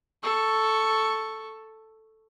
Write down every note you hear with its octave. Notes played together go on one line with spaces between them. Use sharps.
A4 C#6